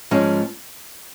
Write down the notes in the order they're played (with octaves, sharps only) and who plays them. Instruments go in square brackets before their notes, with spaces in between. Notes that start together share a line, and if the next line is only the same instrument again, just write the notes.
[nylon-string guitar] G#2 F3 G#3 C#4